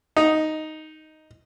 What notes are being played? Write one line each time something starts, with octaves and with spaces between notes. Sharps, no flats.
D#4